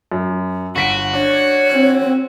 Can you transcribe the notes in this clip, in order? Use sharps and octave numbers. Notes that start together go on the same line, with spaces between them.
F#2
G1 F#4 F#5 B6 D7
D4 C#5
C4